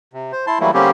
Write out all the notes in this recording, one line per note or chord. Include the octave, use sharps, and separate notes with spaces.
C3
C5
E4 A5 C6
E3 F#3 G3 A3 A#3 E4
D3 G3 A#3 C4 C#4 G4